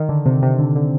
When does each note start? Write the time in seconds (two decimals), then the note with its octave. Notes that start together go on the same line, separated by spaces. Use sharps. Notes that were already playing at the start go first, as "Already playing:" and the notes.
Already playing: D#3
0.09 D3
0.26 C3
0.42 C3
0.59 D3
0.76 D3